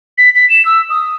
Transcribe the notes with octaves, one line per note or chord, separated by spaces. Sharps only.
B6
B6
E7
E6
D#6